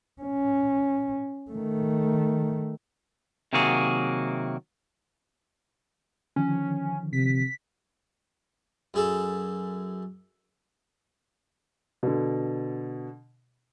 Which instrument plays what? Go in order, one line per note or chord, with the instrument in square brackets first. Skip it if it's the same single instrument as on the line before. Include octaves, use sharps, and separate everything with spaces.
[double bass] C#4
D#3 A3
[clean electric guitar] C3 D#3 F#3 A#3 F#4 G#4
[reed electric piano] D3 D#3 F3 [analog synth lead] C#4
[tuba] C3 [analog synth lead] B6
[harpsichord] F#2 G#4 A4
[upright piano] B2 D3